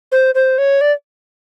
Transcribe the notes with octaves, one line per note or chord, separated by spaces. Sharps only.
C5
C5
C#5
D5